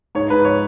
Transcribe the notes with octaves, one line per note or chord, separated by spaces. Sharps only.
G#2 C#5
G#2 B4
C#5